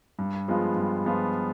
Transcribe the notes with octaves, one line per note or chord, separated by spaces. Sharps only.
G2
F3 G#3 B3 F4
G2
F3 G#3 B3 F4